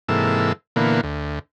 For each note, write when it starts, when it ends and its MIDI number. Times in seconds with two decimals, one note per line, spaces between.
0.09 0.53 44
0.09 0.53 48
0.09 0.53 52
0.09 0.53 58
0.09 0.53 69
0.09 0.53 88
0.76 1.01 46
0.76 1.01 50
0.76 1.01 52
0.76 1.01 58
0.76 1.01 59
1.03 1.39 38